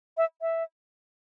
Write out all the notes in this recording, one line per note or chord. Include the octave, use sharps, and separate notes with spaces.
E5
E5